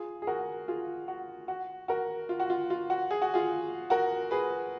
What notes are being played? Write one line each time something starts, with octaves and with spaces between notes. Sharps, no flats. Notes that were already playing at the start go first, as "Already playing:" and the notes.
Already playing: F4 G#4
G#4
F#4 A#4
F4 G#4
F#4
F#4
F#4 A#4
F4
F#4
F4
F4
F#4
G#4
F#4
F4 G#4
F#4 A#4
G#4 B4